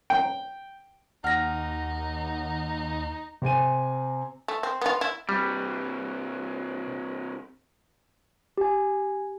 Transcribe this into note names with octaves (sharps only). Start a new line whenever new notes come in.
G5
D#2 D#4 F#5 F6 A#6
C3 C4 G#5 D#7
A3
C4
B3 F4
E4
C3 E3 G3
G4 G#5